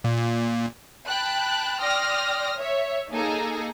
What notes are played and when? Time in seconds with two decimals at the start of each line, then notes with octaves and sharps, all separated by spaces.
0.04 A#2
1.07 G5 A5 B5 F#6
1.81 D5 G5 C6 D#6 F6 A#6
2.59 C#5 E5
3.11 A#3 D#4 G#4 A4 G#5 A#5